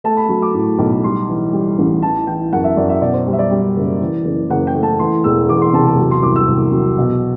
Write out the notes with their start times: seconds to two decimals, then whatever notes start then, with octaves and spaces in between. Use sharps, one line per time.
0.04 A3 A5
0.17 B5
0.29 F#3
0.42 D6
0.54 A2
0.78 B1
1.04 G3 C6
1.29 E3
1.53 G3
1.78 A1
2.02 E3 A5
2.27 E3 G5
2.53 F#2 F#5
2.64 E5
2.77 F#2 D5
2.89 E5
3.02 B2 D5
3.14 C5
3.27 G3
3.33 E5
3.39 D5
3.51 G3
3.76 F#1
4.01 E3
4.25 F#1
4.50 F#1 F#5
4.67 G5
4.75 A3
4.83 A5
4.99 E3 C6
5.24 E1 E6
5.49 E2 D6
5.62 C6
5.73 C3 A5
5.87 A5
5.99 F#3
6.11 C6
6.23 C2 D6
6.36 E6
6.48 C2
6.72 F#3
6.98 B2